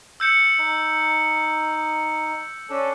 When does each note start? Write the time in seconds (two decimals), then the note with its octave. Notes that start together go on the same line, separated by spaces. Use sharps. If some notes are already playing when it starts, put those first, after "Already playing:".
0.20 E6 G6 C#7
0.59 D#4
2.70 C#4 D4 A4